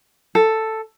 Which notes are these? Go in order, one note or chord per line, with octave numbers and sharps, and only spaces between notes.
A4